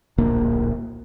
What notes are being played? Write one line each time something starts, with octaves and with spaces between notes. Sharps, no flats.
D1 A#1 A#3